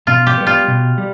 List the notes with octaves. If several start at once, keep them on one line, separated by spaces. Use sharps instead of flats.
B2 F4
G4
G3 B3
F4
B2
G3